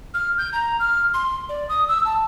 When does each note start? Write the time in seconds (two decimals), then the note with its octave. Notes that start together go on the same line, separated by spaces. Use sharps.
0.14 F6
0.38 G6
0.53 A#5
0.80 F6
1.14 C6
1.49 D5
1.69 D#6
1.88 E6
2.05 A5